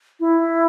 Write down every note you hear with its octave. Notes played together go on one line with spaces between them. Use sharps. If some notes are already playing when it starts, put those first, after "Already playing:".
E4